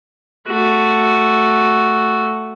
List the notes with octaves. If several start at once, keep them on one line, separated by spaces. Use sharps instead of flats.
A3 F#4